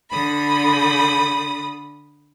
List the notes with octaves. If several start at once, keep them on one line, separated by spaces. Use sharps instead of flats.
D3 B5 D#6